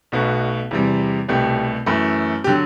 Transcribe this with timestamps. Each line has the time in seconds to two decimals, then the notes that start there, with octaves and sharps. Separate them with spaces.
0.12 B1 B2 A3 F#4
0.71 E2 C3 G3
1.29 C2 B2 A3 G4
1.86 F#2 E3 A3
2.44 G4
2.47 D3 F#3